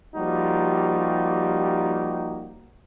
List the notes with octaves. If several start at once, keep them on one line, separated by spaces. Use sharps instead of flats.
F3 G3 A#3 D#4 F#4 G4